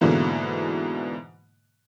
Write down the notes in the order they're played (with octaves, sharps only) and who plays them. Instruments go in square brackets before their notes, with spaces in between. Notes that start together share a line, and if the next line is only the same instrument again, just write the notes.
[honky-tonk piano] G#2 B2 D3 E3 A#3